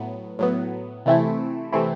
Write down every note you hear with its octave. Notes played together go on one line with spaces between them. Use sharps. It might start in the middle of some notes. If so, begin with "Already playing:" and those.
Already playing: A2 F#3 B3
A2 F#3 B3
C3 E3 A3 C4 E4
C3 E3 A3 C4 E4